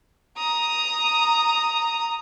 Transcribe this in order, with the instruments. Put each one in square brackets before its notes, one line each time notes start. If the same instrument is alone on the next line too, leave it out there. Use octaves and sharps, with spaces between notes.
[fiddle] A#5 D#6